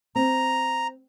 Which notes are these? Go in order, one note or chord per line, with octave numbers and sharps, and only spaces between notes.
C4 A#5